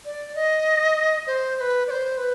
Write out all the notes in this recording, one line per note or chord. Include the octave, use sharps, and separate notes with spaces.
D5
D#5
C5
C5
B4
D5
C5
B4